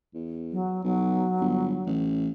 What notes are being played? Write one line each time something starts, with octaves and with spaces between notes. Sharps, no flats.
E2
F#3
B1 F#3
G1
A1